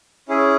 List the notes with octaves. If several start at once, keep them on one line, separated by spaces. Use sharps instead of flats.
C#4 E4 G#4